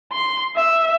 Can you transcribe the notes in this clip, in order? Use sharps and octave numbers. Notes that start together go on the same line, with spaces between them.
C6
E5